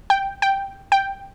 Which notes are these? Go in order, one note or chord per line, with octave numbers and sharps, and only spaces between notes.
G5
G5
G5